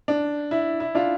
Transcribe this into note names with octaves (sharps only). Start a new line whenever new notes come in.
D4
E4
E4
D4 F4